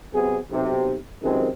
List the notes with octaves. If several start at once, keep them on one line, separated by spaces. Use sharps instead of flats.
C3 F#3 B3 G#4
B1 C3
C#2 F#2 C3 D#3 G#3 C4